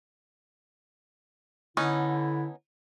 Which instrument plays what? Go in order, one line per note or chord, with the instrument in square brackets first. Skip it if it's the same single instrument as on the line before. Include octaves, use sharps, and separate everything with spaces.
[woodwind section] D3 E4 [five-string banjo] B3 C#4 D#4